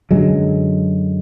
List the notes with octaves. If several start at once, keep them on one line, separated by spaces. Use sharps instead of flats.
F#2 D3 F#3 G#3